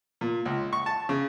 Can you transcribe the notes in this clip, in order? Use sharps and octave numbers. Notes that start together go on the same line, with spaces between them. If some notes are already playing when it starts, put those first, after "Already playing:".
A#2
C#2
C#6
A5
C#3